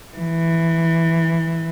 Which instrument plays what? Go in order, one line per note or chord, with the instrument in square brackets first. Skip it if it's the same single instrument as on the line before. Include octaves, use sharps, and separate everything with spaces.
[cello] E3